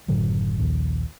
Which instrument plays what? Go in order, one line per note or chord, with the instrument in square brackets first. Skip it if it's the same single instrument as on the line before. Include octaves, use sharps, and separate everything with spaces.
[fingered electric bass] F#1 A2 D3 F#3
A#1 D#2